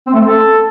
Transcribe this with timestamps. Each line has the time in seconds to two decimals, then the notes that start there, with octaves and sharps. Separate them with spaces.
0.07 C4
0.13 A3
0.20 C4
0.27 A4